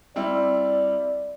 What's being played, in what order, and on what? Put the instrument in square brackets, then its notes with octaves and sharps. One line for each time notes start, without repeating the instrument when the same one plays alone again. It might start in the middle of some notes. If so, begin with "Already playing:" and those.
[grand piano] G3 C4 E4 [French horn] D5